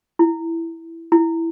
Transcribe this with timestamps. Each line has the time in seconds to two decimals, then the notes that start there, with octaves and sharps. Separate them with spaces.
0.19 E4
1.12 E4